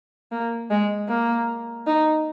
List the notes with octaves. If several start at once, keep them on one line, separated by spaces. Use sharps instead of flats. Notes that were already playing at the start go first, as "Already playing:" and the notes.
A#3
G#3
A#3
D#4